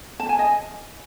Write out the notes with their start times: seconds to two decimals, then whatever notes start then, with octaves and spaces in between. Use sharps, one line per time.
0.20 A5
0.29 G#5
0.39 D#5